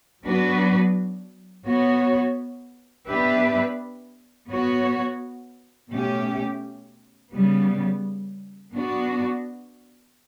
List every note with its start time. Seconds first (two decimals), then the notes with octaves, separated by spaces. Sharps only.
0.24 F#3 B3 D4 F#4 B4
1.66 B3 F#4 C#5
3.07 B3 D4 G4 B4 E5
4.48 B3 F#4 C#5
5.90 B2 A3 C#4 G4
7.31 C#3 G3 B3
8.72 B3 D4 F#4